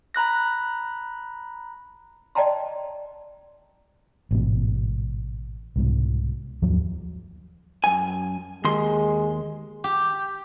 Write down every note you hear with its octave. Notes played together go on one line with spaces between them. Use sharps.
A#5 B5 F#6 A#6
D5 D#5 G5 A5 A#5 C6
A1 G#2 B2
C2 G#2 B2
D#2 G#2 F3 F#3
F#2 G#5
D#2 G#3 C6
G4